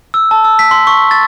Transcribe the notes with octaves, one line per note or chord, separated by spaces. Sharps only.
E6
A5
E6
B6
C6
C#6
A6